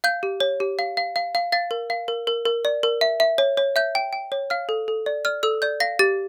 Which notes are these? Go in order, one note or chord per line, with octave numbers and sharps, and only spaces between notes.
F5 G6
G4
C#5
G4
F5
F5
F5
F5
F5 A6
A#4
F5
A#4
A#4
A#4
D5
A#4
E5
E5
C#5
C#5
E5 G6
G5
G5
C#5
F5 F6
A4
A4
D5
D5 F6
A4 E6
D5 G6
F5 A#6
G4 A6